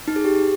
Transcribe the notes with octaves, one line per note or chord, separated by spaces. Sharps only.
D#4
G#4
G4